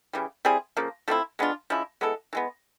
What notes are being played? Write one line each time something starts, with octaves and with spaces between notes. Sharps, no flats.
C#3 E3 G3
G3 C4 E4 G#4
C#3 F3 A#3
F3 A3 C4 E4
G#3 B3 D4 F4
F3 G#3 C#4 E4
G#3 B3 E4 A4
E3 G#3 B3